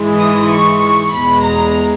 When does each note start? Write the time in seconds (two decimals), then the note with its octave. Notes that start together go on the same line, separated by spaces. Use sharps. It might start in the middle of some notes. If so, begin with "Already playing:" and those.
Already playing: G#2 E3 G#3
0.20 D#6
0.51 C#6
0.81 C#6
1.12 E2 B2 G#3 B5
1.43 A#5